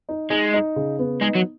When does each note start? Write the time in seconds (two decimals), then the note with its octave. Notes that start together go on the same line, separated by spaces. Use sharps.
0.09 D#4
0.30 G#3 D#4
0.54 D#4
0.76 C#3
0.99 B3
1.21 G#3 D#4
1.35 F#3